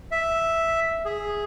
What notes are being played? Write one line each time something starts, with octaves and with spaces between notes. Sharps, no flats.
E5
G#4